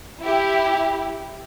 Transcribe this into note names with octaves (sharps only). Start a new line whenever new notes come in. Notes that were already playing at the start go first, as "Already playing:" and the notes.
E4 G4